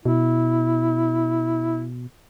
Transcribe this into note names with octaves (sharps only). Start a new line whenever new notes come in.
B2 E4